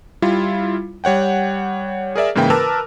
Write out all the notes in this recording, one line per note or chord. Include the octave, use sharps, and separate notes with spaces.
G3 E4 F4
G3 C#5 F#5 G5
G#4 A#4 D5 E5
G#2 C#3 E3 A#3 E4 G5
A#4 B4 A5 D6 E6 F6